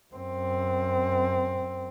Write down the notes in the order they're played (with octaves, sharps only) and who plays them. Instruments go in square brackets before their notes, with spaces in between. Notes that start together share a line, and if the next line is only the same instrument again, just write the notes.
[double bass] F#2 C4